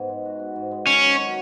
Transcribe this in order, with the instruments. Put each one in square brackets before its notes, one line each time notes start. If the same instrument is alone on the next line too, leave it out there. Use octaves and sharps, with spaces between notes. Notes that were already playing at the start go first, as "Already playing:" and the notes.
Already playing: [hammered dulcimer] G#2 B3
G#3
F#4
B3
G#2
G#3
[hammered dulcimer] D#3 [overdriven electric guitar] C#4
[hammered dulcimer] F#3
F#4